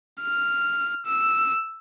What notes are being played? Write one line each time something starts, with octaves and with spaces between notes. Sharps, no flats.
F6
E6